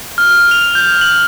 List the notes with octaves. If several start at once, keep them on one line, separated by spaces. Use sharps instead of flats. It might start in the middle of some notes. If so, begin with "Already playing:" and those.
F6
F7
G6
F#7